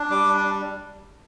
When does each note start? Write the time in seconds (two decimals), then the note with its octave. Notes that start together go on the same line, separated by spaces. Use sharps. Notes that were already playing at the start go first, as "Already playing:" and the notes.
Already playing: D4
0.10 G3 D6
0.33 D4